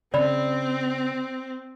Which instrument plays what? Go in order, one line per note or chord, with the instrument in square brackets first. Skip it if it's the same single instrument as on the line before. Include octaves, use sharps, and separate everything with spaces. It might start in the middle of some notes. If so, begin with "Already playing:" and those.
[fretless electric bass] C#3 [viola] C4 [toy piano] D5 B5